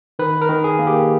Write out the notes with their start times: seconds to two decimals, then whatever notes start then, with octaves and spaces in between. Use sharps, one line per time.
0.19 D#3 B4
0.41 A#4
0.49 D#3
0.64 G#4
0.79 A#3
0.87 G4